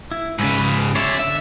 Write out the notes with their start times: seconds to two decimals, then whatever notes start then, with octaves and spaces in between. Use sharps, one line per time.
0.11 E4
0.39 G#2 C#3 B4
0.95 C#4 G#4 C#5 D5 E5
1.19 D3 E5